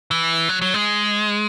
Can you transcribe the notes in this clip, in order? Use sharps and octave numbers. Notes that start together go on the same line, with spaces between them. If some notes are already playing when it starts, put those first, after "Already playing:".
E3
F#3
F#3
G#3